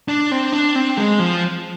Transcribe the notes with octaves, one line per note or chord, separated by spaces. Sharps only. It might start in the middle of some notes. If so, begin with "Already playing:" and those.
D4
C4
D4
C4
G#3
F3